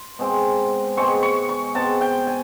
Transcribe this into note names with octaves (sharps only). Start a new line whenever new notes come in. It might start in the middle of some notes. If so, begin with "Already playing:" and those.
Already playing: C6
B2 G#3 C4
B2 G#3 C4 C#6
C#6
C#6
B2 G#3 C4 A5
G5
G#5